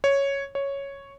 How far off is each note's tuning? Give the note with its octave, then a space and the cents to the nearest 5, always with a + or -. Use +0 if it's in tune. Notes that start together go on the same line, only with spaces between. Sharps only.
C#5 +0
C#5 +0